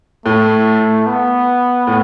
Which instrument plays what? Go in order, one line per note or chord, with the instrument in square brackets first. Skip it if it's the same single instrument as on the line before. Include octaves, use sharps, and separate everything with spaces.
[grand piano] A2 [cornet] A3
[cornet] B3
[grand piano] A2